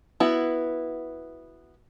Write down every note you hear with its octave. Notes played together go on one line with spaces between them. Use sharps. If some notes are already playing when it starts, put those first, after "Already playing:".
B3 E4 F#4